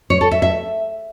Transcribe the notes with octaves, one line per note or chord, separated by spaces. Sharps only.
C#5
A4
E5
E5